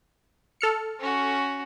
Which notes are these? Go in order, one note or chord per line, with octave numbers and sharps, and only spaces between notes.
A4 F6 C#7
C#4 F#4